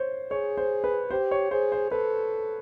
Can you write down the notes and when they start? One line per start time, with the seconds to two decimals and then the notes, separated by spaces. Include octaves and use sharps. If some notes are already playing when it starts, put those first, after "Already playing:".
Already playing: C5 C#5
0.31 G#4 C#5
0.57 C5
0.84 B4
1.11 G4 C5
1.31 C#5
1.51 G#4 C5
1.72 C5
1.91 A4 B4